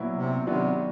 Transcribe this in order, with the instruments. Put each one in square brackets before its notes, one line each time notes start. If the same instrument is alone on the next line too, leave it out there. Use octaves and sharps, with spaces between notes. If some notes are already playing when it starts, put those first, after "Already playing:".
Already playing: [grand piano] A#2 F#3 B3 E4
[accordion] C3
[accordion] C3 [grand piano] D#3 F#3 B3 D4